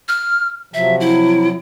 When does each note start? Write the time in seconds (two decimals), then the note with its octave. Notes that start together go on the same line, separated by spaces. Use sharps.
0.08 F6
0.74 C3 F3 F#3 E5
1.00 E4